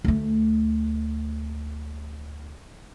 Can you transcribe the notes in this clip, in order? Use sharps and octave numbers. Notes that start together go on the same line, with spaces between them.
D2 A3